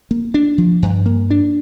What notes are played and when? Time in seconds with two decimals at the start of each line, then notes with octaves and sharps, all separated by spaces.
0.11 A#3
0.34 D4
0.58 F3
0.82 G2
1.06 A#3
1.31 D4